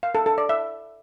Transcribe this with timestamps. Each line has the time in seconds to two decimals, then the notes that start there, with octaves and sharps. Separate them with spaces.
0.03 F5
0.15 A4
0.26 A4
0.38 D5
0.49 E5